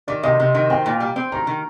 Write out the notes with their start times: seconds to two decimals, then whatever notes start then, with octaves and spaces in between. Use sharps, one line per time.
0.08 D#3 D5
0.23 C3 D#5
0.40 C3
0.55 D#3
0.70 C4 G5
0.86 A#2
1.00 G3
1.16 C4
1.32 D#3 A#5
1.47 D#3